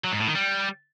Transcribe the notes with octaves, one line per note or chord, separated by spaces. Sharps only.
F#3
G#2
A2
D#3
G3